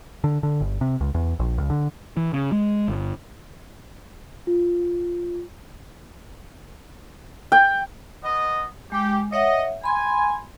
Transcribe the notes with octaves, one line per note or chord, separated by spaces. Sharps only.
D3
D3
G1
C3
C#2
E2
A#1
C#2
D3
E3
C#3
G#3
G1
F4
G5
B3 D#5
G#3 G4
C#5 D#5 E5 F#5
G#5 B5 C6